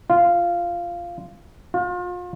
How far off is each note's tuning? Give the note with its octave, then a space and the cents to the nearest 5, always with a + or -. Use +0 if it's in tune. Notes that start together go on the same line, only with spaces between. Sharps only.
F4 -10
F4 +35